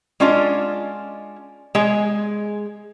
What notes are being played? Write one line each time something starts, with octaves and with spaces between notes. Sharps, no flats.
G#3 C#4 D4 F4 D#5
G#3 G#4